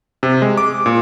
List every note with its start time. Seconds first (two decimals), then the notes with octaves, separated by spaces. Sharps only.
0.23 C3
0.42 G#3
0.57 D6
0.86 A#2